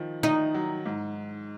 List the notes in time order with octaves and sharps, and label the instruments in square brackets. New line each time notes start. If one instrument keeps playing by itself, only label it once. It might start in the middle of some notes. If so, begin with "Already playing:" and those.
Already playing: [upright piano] D#3 F3
[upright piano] D#3 [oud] D#4
[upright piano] F#3
G#2